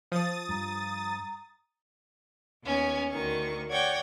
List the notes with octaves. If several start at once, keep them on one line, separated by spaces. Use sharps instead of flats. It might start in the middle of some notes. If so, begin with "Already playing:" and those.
F3 A5 D#6 A6
G2 A#5
D#2 B3 C#4 G#5
D2 D#3 C#6
C#5 D5 F#5 G5 G#6 A#6